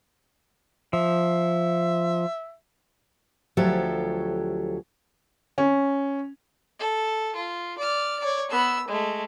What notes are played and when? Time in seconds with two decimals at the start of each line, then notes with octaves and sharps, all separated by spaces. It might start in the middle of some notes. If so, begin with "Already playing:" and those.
0.93 F3 E5
3.57 D2 F3 F#3 G4 A4 E5
5.58 C#4
6.79 A4
7.35 F4
7.78 D5 F6
8.19 C#5 D5
8.50 B3 E6
8.88 G#3 A3